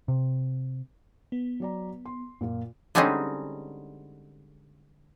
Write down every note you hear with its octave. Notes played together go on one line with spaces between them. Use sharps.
C3
B3
F#3 D5 A#5
C6
F#2 A#2 A#3 F4
D3 G3 G#3 C4 C#4 D#4